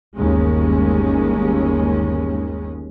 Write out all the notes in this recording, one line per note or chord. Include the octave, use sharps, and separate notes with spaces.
G1 D#2 G#3 C#4